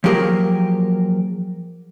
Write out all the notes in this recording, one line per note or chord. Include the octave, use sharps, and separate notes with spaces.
F3 F#3 A#3 G4 G#4 A#4